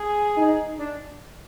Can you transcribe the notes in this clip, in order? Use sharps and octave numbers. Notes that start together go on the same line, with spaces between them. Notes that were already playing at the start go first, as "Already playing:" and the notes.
Already playing: G#4
D#4
D4